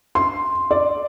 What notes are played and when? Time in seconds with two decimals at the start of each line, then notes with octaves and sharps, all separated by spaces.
0.15 C6
0.71 D5